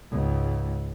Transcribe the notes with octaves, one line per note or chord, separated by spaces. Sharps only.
C#2 G#2